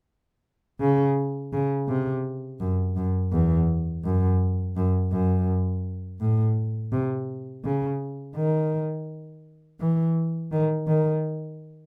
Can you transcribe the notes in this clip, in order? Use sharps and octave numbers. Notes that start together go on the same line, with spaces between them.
C#3
C#3
C3
F#2
F#2
E2
F#2
F#2
F#2
A2
C3
C#3
D#3
E3
D#3
D#3